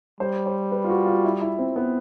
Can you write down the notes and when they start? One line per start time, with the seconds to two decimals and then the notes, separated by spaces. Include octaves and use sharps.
0.20 G3 C5
0.46 C5
0.72 B4
0.84 F4
0.90 F#4
1.06 F4
1.25 E4
1.41 E4
1.59 C4
1.76 B3